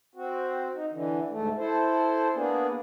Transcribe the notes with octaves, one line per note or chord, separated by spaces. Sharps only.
C4 F#4
D#4
D3 E3
D2 G#2 A3
E4 A4 C5
A#3 B3 D4 G#4